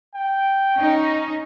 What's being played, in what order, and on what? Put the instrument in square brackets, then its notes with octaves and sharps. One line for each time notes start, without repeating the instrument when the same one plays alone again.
[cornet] G5
[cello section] C#4 D#4